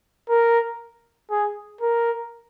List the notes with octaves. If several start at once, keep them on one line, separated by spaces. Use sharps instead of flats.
A#4
G#4
A#4